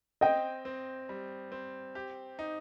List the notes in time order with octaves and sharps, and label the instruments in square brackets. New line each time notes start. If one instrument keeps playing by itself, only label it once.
[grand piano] C4 [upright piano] D#5 G5
[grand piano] C4
G3
C4
G4
D#4